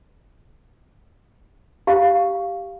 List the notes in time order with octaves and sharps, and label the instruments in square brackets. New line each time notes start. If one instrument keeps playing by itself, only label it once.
[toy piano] G4 F5